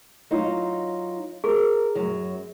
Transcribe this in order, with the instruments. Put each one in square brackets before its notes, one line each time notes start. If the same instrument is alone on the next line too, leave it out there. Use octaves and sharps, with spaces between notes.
[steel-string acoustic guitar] F#3 D#4 F4
[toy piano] G#4 [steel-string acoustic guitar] A#4
[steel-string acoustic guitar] F#2 F#3